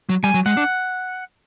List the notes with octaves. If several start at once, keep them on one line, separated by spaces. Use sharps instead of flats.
F#3
G3 G#5
F#3
G#3 F#5
D4